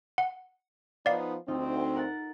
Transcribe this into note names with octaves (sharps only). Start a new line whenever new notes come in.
F#5
F3 B3 D#4 D5 F5
D2 C4 D#4 F4
A#4 F#5 A6